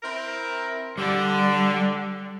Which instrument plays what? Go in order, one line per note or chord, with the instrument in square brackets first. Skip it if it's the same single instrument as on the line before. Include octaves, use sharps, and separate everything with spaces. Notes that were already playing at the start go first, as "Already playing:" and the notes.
[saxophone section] C4 E4 A#4
[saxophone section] D3 [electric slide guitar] G3